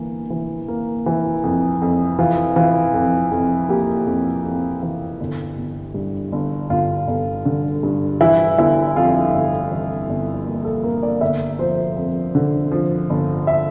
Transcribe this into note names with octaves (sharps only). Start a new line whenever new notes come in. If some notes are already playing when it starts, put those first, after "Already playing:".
Already playing: G1 E3 A#3
E3
A#3
E3
F2
F2
E3 F4
E3 F4
F2
F2
A#3 G4
F2
F2
E3
G1
G1
G2
G1
G1 F4
G1
D3
G2
E3 E4
G1 E4
F2 F4
G1
E3
G1
A#3
A4
A#3 A#4
D5
G1 E5
F3 C5
F2
D3
F3
G1
E5